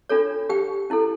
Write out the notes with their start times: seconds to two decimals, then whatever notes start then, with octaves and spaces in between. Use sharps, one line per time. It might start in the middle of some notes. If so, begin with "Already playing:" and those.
0.09 D4 F4 A4 C#5
0.49 G4 G5
0.90 C#4 E4 A4